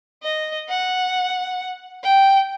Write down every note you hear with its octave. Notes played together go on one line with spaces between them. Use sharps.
D#5
F#5
G5